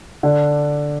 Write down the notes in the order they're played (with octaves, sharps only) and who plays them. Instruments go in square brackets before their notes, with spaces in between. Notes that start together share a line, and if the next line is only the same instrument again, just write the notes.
[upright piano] D3 D4